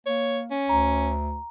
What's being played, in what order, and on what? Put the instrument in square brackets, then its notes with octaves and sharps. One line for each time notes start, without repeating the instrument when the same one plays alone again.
[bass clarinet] A#3 [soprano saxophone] C#5
[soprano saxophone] C#4
[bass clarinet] D2 [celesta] A#5